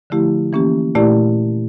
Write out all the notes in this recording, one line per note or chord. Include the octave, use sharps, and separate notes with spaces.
D3 F3 A3 E4 G4
E3 A#3 C#4 G4
A#2 A3 E4 G4 D5